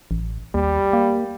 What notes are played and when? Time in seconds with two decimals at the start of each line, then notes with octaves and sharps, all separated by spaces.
0.11 A1
0.55 D#2 G3
0.93 A#3